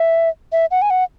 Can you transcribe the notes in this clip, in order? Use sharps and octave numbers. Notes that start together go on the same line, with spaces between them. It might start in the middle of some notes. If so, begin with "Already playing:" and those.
Already playing: E5
E5
F#5
G#5
F#5